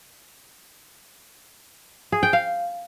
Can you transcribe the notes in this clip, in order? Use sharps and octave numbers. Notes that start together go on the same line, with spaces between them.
G#4
G5
F5